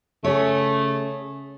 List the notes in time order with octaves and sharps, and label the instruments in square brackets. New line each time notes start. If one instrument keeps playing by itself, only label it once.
[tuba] C#3 [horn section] A3 [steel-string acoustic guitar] G#4 C#5